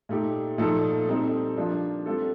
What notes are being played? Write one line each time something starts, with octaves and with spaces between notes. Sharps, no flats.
A#2 A3 D#4 G4
A#2 F3 A3 D#4 A4
G3 C4 D#4 A4
F3 A#3 D4 F4
G3 C4 F4 A4